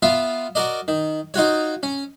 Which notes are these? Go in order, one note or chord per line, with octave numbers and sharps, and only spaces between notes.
B3 F4 E5 F5
F#4 A#4 D5 D#5
D#3
D#4 F4 F#4 C#5
C#4